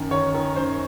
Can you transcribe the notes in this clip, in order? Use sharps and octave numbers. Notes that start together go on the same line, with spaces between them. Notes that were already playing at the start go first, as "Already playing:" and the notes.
Already playing: F#2 D#3
D#3 C#5
D#3
F#2 C5